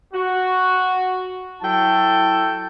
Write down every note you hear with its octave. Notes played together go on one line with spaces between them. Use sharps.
F#4
F#3 E4 A4 G5 A5